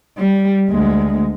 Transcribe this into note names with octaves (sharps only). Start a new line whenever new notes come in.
G3
D2 G#3